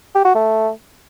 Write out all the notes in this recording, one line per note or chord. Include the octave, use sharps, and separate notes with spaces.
G4
F#4
A3